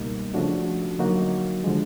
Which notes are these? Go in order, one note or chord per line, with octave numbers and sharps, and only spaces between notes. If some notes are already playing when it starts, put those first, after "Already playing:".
Already playing: C#2 B2 G3 A#3 D#4
C#3 F3 A3 D4 F#4
D3 F#3 A#3 D#4 F#4
D3 F3 G#3